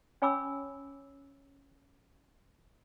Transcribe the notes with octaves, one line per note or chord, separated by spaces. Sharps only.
C#4 C#5 G#5 B5 D6 E6